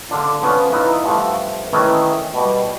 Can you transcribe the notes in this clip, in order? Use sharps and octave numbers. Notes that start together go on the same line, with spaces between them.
D3 D4 F4
F3 B3 C#4
E3 D#4 F4 B4
G2 F3 G3 A3 E5 F#5
D#3 E3 A3 C#4 D#4
B2 G3